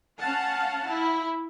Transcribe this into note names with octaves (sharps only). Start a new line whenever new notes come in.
C#4 F5 F#5 A5
E4